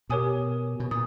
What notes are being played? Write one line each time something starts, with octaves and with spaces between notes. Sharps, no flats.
B2 G4 A#4 C#5 G#5 D#6
B2
A#2 D#6